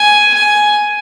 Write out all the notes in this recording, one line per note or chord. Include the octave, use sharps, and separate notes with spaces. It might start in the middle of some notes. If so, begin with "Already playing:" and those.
Already playing: G#5
G#5